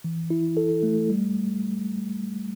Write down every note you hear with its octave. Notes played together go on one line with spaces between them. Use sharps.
E3
E4
A4
A3
G3